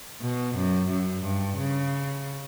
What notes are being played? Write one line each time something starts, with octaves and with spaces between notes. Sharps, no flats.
B2
F#2
F#2
G2
C#3